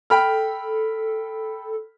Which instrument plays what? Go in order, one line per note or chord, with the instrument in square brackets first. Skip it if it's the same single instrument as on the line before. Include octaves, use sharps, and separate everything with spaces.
[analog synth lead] A4 [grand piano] G5 B5 F6